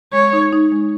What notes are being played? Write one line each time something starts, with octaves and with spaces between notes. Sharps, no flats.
G#3 C#5
D#4
D#4
G#3